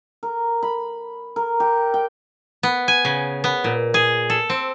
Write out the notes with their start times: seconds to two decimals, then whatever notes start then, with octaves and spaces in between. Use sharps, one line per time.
0.23 A#4
0.63 B5
1.36 A#4
1.60 G4
1.94 G5
2.63 B3
2.88 G#5
3.05 C#3
3.44 B3
3.64 A#2
3.94 G#4
4.30 A4
4.50 C4